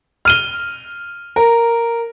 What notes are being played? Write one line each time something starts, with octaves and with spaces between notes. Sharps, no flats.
F6 D#7 G7
A#4